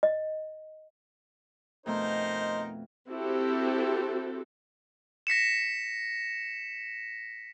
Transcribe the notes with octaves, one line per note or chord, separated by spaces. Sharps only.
D#5
F2 B2 A3 D#4 A#4 C5 D#5
C4 E4 F#4 G4 A4
A#6 B6 C#7 E7